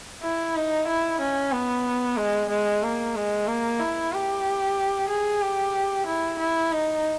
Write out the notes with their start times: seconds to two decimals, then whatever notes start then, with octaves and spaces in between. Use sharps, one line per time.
0.22 E4
0.56 D#4
0.88 E4
1.21 C#4
1.52 B3
2.17 G#3
2.49 G#3
2.83 A#3
3.15 G#3
3.47 A#3
3.80 E4
4.13 G4
5.09 G#4
5.42 G4
6.06 E4
6.39 E4
6.72 D#4